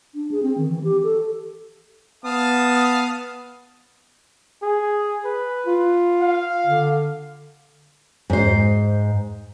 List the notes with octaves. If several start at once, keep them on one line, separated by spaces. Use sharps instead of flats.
D4
G#4
C4
D#3
E3
G4
A4
B3 F5 A5 D#6
G#4
B4
F4
F5
D3
G#2 C5